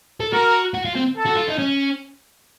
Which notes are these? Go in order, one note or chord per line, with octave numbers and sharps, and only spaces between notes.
A4
F#4 A#4
F#4
F4
C4
A4
F#4
F4
D#4
C#4